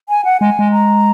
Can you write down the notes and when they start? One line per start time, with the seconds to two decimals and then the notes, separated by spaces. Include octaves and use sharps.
0.09 G#5
0.25 F#5
0.40 G#3 G#5
0.59 G#3
0.72 A#5